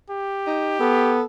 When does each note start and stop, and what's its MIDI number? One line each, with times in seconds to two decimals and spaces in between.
0.10 1.16 67
0.47 0.79 63
0.80 1.24 59
0.80 1.24 69